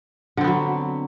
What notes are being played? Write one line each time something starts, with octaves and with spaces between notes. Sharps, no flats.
D3 F#3 B3 C4